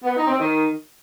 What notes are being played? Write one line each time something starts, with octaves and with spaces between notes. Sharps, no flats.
B3
D#4
C4
D#3